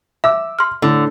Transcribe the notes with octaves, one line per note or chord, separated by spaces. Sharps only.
E5 D6 E6
C6 F6
A2 D3